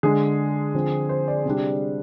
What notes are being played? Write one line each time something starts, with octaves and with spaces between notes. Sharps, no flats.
D3 G#3 D4 G#4
D3 F3 C4
C5
D5
C3 G3 D4